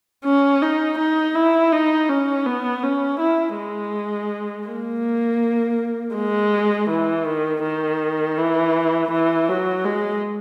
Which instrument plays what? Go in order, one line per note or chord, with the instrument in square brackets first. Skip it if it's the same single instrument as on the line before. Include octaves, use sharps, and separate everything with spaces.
[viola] C#4
D#4
D#4
E4
D#4
C#4
B3
C#4
E4
G#3
A#3
G#3
E3
D#3
D#3
E3
E3
F#3
G#3